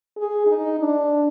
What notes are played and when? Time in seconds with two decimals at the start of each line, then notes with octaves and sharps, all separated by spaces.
0.17 G#4
0.46 D#4
0.79 D4